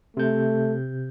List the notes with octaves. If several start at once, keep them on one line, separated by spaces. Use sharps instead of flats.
C3 A3 G6